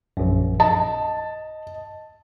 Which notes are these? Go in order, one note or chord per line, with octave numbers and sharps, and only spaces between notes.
A#1 F#2
D#5 A5